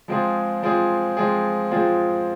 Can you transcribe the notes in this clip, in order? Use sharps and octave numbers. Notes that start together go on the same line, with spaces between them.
F3 G#3 C4 F4 G#4
F3 G#3 C4 F4 G#4
F3 G#3 C4 F4 G#4
F3 G#3 C4 F4 G#4